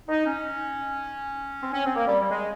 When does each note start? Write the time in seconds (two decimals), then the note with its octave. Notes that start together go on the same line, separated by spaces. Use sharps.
0.09 D#4
0.26 C#4
1.62 C4
1.73 C#4
1.85 C4
1.96 A#3
2.08 G3
2.20 G3
2.30 G#3